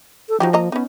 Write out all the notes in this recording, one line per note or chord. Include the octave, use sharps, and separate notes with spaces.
A4
F3 F#3 D#4 G4
A#3 D#5 A#5
B3 C#4 D#4